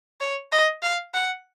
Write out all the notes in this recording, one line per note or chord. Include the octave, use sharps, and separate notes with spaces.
C#5
D#5
F5
F#5